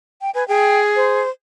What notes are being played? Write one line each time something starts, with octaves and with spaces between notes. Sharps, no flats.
G5
B4 G#5
G#4 G5
C5